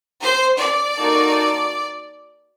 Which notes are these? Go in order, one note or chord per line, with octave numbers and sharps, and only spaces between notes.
C5
D5
A#3 D#4 F#4 A4